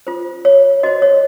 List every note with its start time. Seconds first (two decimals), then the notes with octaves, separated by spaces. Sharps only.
0.07 F4 C5
0.45 C#5
0.83 F#4 C5 D#5
1.02 C#5